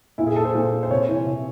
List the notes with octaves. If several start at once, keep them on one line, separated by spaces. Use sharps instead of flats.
A#2 E4
G#4
A4
C5
A#2
C5
C3 C#5
E3
C3